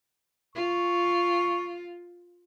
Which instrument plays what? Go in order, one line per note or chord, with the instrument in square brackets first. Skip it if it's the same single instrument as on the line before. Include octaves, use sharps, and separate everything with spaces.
[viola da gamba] F4 [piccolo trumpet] C#6